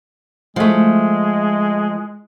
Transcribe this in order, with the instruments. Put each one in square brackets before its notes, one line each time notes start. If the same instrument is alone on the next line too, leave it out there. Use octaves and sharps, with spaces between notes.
[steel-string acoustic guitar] F3 A3 [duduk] G#3